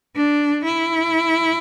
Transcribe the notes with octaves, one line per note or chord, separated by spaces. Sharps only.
D4
E4